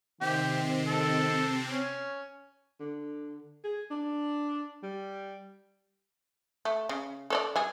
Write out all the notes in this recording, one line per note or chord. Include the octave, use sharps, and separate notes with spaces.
C3 D#3 C4 G4
A4
C#4
D3
G#4
D4
G3
A3
C#3
A4 C#5 D5
G3 G#4